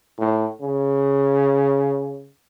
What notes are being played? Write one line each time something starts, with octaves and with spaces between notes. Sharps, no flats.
A2
C#3